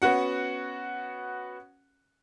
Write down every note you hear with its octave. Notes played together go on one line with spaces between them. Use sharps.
B3 C#4 F#4 F#5